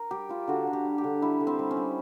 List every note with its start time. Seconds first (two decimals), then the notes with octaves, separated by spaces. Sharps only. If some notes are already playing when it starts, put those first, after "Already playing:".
Already playing: A#4
0.11 G3 G4
0.29 G3 F4
0.48 D3 F#4
0.67 D3
0.73 G4
0.85 G3
0.98 G4
1.04 D3
1.22 G3 E4
1.40 D3
1.47 C4
1.59 G3
1.71 C#4
1.77 G3